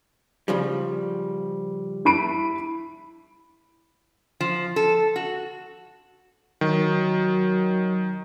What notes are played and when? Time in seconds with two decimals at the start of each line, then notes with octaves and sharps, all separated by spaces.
0.48 C#3 F3 G3
2.05 E4 B5 D7
4.40 F3
4.76 A4
5.16 F#4
6.61 D#3 F#3